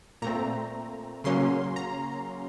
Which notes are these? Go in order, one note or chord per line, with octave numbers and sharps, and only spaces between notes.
A#2 A3 C4 A#5
C#3 F#3 A#3 C#4 C6
A#5